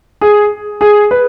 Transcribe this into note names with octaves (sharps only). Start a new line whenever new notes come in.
G#4
G#4
B4